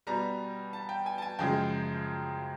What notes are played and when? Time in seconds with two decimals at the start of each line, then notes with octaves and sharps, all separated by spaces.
0.07 B2 G3 A#5
0.73 A5
0.89 G5
1.06 G#5
1.18 A5
1.22 G#5
1.39 F#2 C#3 F3 G#3 G5